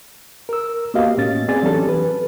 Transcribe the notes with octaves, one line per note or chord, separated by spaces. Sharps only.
A#4 E6
A#3 B3 F#4 G4 D#5 F5
A2 C#4 A6
B3 C4 G#4 D5 G#5 A6
E3 F#3 C#4 D4 G4 A4
B4